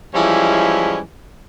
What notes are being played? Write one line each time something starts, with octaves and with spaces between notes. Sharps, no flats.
E3 F3 G3 G#3 C#4 E4